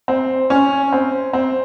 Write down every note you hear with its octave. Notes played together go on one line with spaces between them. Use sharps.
C4
C#4
C4
C4